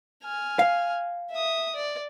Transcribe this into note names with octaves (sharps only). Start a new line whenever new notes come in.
G#5 F6
F5
E5 D#6
D5